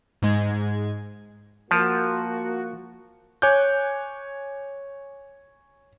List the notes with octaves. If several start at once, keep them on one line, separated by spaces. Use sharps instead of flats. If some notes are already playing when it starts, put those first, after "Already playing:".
G#2 G#3 G#6
F3 A#3 F#4
C#5 G#5 D6 F#6 G6